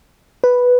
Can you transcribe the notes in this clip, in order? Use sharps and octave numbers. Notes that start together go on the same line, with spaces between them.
B4